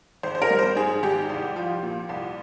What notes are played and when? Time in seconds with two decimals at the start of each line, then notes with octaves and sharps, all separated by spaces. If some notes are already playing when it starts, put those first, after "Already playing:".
0.23 G#1 C5
0.35 C5
0.42 A#4
0.50 G3
0.59 C5
0.76 G#2 G#4
1.03 G#1 G4
1.29 C2
1.56 F3
1.83 A#2
2.09 C2